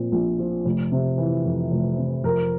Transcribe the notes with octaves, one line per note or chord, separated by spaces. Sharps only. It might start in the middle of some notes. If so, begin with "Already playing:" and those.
Already playing: A#2 F3 C4
A#1
F3
F1
C3
E3
F2
F1
C3
F2 A#4